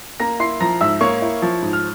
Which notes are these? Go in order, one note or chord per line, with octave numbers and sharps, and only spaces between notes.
A#3 A#5 A#6
E4 C6 C7
F3 A#5 A#6
G#2 E5 E6
A#3 C#5 C#6
E4
F3
G#2
F6